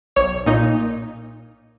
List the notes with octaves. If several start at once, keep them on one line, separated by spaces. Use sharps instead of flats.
B1 C#5
A#2 D#4